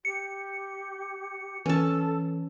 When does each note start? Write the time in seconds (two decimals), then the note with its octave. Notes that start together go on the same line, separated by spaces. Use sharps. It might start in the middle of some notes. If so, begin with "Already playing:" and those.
0.05 G4 C#7
1.66 E3 C#4 A4 A5